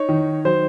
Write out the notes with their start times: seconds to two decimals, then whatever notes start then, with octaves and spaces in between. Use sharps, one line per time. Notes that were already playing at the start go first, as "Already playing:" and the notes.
Already playing: D#4 C#5
0.09 D#3
0.45 F#3 C5